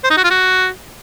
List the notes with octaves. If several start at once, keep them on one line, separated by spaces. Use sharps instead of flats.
C5
D#4
F#4
F4
F#4